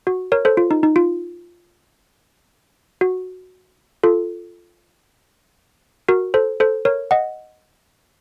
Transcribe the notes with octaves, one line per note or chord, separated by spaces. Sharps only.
F#4
A#4 C#5
A4 C5
F4
D#4
D#4
F4
F#4
F4 A4
F#4 A#4
A4 C5
A4 C5
A#4 C#5
D#5 F#5